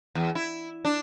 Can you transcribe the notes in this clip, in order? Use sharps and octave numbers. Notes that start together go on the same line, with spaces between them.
E2
E4
D4